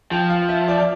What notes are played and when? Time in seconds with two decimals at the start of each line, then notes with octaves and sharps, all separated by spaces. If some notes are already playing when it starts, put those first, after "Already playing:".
0.11 F3 G5
0.30 F5
0.49 E5
0.68 D5
0.79 D5